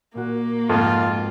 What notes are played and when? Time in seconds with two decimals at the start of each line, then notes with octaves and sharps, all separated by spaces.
0.15 A#2 A#3 F#4
0.69 F2 G#2 F4